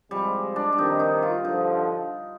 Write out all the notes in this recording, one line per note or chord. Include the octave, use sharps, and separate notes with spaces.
C3 F3 G3 G#3
D4
D4
F2 C3 D#3 D#4
D#4
F4
G2 D3 F3 D#4